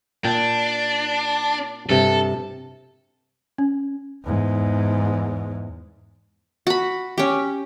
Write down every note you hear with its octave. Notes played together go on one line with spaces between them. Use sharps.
A#2 D4 G5
G2 C3 A4
C#4
E2 G#2
F#4 B5
C#4 G4